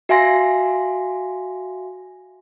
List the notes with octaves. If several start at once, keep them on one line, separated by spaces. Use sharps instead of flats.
F#4 E5 F5 G#5 C6 A#6